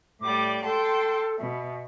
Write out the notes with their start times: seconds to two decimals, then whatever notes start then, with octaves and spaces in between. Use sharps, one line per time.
0.21 A2 G3 D5 D6
0.64 A4 G5 A5 C6
1.39 B2 E5